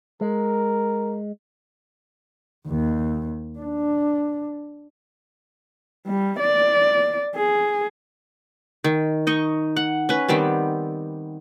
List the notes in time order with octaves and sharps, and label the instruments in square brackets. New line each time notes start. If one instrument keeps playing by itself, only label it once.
[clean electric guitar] G#3 [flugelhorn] A#4
[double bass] D#2
D4
[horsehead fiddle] G3
D5
G#4
[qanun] D#3
D#4 D#5 C#6
F#5
C#4 B4
D#3 G3 B3 C4